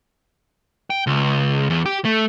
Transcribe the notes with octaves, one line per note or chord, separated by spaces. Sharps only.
G5
C#2
E2
G4
A3